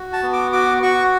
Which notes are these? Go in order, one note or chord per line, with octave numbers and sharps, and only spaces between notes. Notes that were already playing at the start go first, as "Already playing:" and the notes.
Already playing: F#4
A5
B3
D6
F#4 D6
F#4 C#6